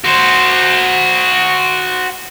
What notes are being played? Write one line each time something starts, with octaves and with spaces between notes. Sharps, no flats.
F#4 C5